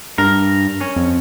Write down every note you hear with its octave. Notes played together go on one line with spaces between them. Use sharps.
G2 A#4
C#4
F2